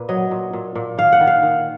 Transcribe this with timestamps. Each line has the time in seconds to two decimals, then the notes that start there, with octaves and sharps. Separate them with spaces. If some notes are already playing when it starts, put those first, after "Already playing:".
Already playing: A#2 B4
0.09 F#3 D#5
0.31 A#2
0.53 A#2
0.75 A#2
0.98 D#3 F5
1.12 F#5
1.21 D#3
1.27 F5
1.43 D#3